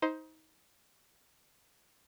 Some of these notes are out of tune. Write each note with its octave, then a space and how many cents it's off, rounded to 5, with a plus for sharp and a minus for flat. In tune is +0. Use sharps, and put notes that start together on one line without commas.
D#4 +25 C5 +0